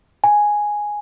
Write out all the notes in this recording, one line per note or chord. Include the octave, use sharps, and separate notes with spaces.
G#5